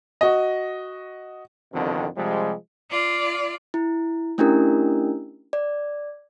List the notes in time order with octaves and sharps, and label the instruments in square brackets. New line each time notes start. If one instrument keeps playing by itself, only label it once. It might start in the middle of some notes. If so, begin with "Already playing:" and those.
[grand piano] F#4 D#5
[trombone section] C2 F2 B2 D3 D#3
C3 F3 G3 G#3
[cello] F4 D5
[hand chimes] E4
A3 C#4 D4 E4 G4 A#4
D5